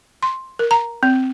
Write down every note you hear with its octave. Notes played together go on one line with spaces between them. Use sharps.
C6
A#4
A#5
C4